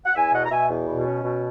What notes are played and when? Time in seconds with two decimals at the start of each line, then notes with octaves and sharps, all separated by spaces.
0.06 F#5
0.15 E2 E5 G#5
0.33 B2 D#5 F#5
0.45 A#5
0.51 B2 E5 G#5
0.69 E2
0.88 B2
1.05 C#4
1.23 B2